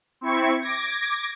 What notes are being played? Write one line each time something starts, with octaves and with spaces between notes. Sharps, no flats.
C4 E4 C#6 G#6 C#7
D6 G#6 A#6